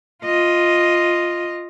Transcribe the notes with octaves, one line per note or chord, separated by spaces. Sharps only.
F4 D#5